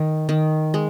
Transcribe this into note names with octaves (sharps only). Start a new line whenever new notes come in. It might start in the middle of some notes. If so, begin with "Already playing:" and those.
Already playing: D#3
D#3
G#3